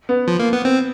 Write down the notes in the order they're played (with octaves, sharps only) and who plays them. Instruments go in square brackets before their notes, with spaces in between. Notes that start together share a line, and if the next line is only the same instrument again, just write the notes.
[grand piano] B3
[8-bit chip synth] F3
A#3
B3
C4